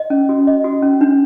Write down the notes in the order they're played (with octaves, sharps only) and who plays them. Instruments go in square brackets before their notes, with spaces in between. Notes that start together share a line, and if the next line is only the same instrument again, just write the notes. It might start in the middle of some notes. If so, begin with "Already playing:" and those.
Already playing: [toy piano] D#5
C#4
F#4
D#5
F#4
C#4
D4